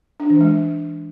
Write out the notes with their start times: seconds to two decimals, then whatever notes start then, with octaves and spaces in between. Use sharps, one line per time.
0.20 D4
0.30 E3
0.41 G#3